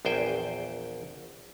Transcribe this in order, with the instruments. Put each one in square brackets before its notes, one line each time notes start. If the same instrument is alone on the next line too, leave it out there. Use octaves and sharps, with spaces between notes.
[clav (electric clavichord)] A#1 E2 C5 G5 G#5